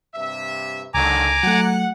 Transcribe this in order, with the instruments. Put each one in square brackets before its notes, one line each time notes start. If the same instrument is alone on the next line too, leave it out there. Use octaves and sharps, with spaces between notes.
[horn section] G2 C3 E5
[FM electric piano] C#2 [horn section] D3 D#3 F#3 [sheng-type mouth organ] G#5 A#5 D6
[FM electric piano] F#3 A3 [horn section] F#5